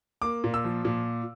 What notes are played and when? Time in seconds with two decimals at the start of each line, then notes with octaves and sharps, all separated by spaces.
0.22 A#3 D6
0.44 A#2
0.54 E6
0.64 F3
0.85 A#2